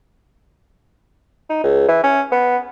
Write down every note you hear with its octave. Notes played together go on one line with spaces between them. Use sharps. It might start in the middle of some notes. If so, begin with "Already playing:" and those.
D#4
C#2
E3
C#4
B3